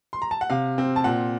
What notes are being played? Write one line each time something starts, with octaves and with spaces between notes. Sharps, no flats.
C6
A#5
A5
F#5
C3 F5
C4
A5
A#2 F#5